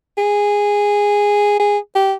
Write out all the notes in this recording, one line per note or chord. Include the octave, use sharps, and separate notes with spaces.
G#4
G#4
G4